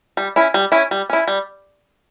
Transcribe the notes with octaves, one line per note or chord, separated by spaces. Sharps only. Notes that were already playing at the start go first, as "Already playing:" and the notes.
G3
C#4 E4
G3
C#4 E4
G3
C#4 E4
G3